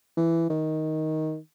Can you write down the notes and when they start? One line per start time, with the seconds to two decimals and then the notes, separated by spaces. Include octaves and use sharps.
0.17 E3
0.50 D#3